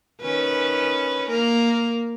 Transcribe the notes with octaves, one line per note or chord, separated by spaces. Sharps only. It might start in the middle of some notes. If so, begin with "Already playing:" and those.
D#3 C#4 B4
A#3 A#4